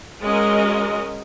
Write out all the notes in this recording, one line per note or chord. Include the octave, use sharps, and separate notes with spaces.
G#3 C#4 F#4 A#4 D#5